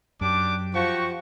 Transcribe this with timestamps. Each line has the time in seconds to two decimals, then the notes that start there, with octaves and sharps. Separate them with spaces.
0.21 F#2 D4 G4 D6
0.74 F3 F#4 G4 C#6